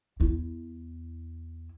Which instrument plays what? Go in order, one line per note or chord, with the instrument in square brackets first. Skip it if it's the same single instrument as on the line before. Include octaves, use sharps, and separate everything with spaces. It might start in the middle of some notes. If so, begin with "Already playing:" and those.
[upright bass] E2 E4